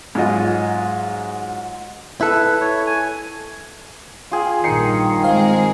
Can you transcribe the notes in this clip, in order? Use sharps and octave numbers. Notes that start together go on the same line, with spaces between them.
G#2 F#3 F4 D#5
E4 A4 B4
C#5
G#5
F4 G#4 G5
A#1 G2 D#3 D#4 C7 C#7
G#3 C4 G#4 C5 F5